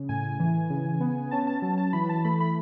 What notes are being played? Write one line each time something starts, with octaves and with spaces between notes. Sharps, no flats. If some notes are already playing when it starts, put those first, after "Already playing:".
Already playing: C#3
A2 G#5
E3
C#3
B3
C#4 A5
A5
F#3 A5
A5
E3 B5
A5
A3 B5
B5